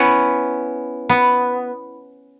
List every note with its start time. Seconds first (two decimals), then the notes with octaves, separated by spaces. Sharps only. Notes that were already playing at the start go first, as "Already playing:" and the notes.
Already playing: B3 C#4 E4
1.09 B3